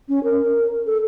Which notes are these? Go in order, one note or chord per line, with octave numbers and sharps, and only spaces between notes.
C#4
A#4
A4